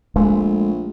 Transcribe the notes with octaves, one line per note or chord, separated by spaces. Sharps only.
A#1 G#3 A3